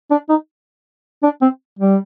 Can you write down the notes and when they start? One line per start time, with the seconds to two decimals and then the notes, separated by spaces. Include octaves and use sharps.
0.11 D4
0.29 D#4
1.23 D4
1.42 C4
1.79 G3